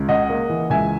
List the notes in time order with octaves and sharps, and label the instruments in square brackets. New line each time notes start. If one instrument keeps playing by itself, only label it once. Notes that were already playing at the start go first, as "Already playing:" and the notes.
Already playing: [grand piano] C#2
C#3 D#5 F#5
A#3
E3
C#2 E5 G#5